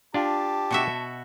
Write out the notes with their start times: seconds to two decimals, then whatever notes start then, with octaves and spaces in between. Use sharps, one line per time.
0.14 D4 F4 G4 F5 A5
0.71 B2 F#4 E5